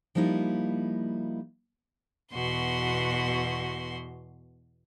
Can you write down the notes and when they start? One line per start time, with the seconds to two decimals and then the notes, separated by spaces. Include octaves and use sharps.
0.15 F3 G3 A#3 D#4 E4
2.33 E2 B2 F#4 C6